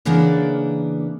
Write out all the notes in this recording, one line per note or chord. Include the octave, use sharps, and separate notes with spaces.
C#3 E3 A#3 B3 D4